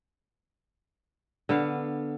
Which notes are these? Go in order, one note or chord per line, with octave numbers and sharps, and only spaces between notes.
D3 B3 F5